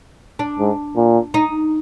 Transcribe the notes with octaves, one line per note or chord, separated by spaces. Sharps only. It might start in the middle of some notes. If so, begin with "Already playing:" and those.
D4
G#2
A#2
D#4